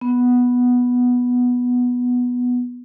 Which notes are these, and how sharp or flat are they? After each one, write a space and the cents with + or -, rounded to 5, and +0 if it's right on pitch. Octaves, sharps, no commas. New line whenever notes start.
B3 -5